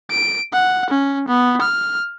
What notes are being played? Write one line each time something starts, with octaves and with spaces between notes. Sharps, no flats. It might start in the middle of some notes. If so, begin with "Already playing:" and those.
D7
F#5
C#4
B3
F6